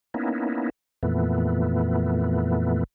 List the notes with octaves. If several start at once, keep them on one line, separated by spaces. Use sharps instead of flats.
A#3 B3 C#4 D#4 E4
F2 A#2 E3 A3 B3